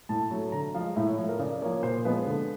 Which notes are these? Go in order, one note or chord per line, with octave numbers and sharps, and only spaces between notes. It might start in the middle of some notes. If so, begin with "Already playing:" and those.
A2 A5
F#3 A3
D3 A#5
F3 G#3 F5
A2 E5
C#5
F3 A3
A#4
C#3 D5
F3 A#3 C#5
A#2 C5
F3 G#3 B3 B4
D3